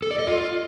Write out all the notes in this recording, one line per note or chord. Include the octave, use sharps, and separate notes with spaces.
A4
D5
D#5
F4